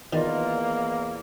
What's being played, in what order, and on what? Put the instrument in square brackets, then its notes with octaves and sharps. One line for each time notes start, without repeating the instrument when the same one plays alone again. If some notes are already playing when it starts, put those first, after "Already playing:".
[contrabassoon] E2 [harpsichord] D#3 [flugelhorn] A#3 [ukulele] F4 D5 D#5